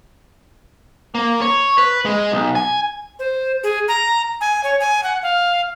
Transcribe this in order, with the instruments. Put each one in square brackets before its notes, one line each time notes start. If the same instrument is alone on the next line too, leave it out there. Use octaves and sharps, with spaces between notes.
[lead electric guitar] A#3
C#5
B4
G#3
B1
G#5
[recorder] C5
G#4
A#5
G#5
C#5
G#5
F#5
F5